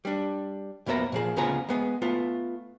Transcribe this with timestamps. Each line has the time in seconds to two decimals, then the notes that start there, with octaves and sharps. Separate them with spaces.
0.05 G3 D4
0.86 B1 F2 A#3 B3 E5 A#5
1.12 A#2 F3 G#4
1.36 D2 C#3 B3 F4 G#4 A#5
1.69 G#3 B3 G#4
2.02 A3 B3 F4